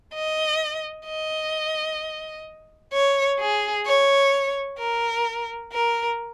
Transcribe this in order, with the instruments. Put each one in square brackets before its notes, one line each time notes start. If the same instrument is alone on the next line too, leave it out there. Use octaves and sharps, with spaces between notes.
[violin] D#5
D#5
C#5
G#4
C#5
A#4
A#4